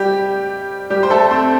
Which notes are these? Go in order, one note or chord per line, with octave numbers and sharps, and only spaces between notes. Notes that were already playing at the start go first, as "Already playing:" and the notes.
Already playing: G3 G4
G3 G4
C5
A3 A4
C4 C5